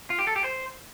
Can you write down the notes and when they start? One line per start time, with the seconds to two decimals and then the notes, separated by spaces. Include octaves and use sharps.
0.10 F4
0.19 G4
0.27 A4
0.36 G4
0.44 C5